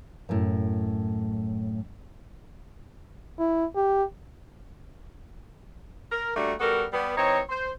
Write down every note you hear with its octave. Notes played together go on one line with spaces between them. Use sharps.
F#2 A2
E4
G4
A#4
G3 A3 A#3 D4 F#4
G3 B3 F#4 A4 A#4
G3 B3
E3 C4 D#4 C#5
C5